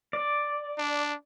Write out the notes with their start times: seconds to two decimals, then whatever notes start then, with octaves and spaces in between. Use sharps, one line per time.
0.13 D5
0.78 D4